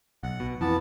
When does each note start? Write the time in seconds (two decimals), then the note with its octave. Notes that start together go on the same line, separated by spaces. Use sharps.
0.23 B1 F#5
0.40 B2
0.61 F2 E3 B3 A5